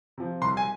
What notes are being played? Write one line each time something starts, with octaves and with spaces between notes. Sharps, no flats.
C3 F3
C2 C6
G#5